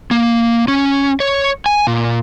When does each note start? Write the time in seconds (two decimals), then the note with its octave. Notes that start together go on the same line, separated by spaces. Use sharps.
0.11 A#3
0.68 C#4
1.20 C#5
1.66 G#5
1.87 A#2